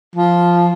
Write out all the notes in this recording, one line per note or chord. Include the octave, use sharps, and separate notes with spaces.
F3